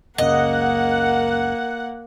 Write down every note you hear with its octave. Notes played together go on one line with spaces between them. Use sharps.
F#1 C#2 C#3 A#3 D#5 F#5